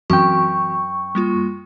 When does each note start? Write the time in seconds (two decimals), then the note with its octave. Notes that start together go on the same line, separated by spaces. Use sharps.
0.10 F#2 E3 C4 F#4 G5 C#6
1.15 G3 A#3 F4